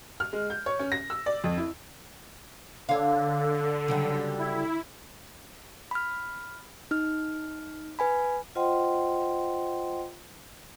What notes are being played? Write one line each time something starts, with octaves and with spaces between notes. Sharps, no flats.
F6
G#3
G6
C#5
C#4
A#6
E6
D5
F2
E4
D3 A4 C#5 F5
C#3 F#3 G3
E4
B5 F6
D#4 F6
B4 G#5 B5
F4 C5 D#5 F#5 G5 C6